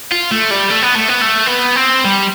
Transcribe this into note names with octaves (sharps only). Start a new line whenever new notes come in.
F4
A3
G3
A3
B3
A3
B3
A3
B3
C4
G3